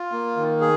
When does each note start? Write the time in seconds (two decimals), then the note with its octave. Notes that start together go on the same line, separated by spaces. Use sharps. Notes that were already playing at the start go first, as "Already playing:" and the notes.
Already playing: F4
0.12 A#3
0.37 D#3
0.61 G#4